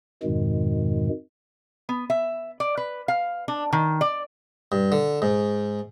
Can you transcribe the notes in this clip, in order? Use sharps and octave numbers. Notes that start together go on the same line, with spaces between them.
F2 G#2 B2 D#3 G#3
B3
E5
D5
B4
F5
D4
D#3
D5
G2
D3
G#2